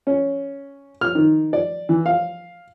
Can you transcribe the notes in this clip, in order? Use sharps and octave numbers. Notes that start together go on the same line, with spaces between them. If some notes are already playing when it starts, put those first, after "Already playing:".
C#4
F6
D#3
D5
E3
F5